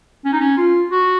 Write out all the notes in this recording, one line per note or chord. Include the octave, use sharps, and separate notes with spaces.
C#4
D#4
C#4
F4
F#4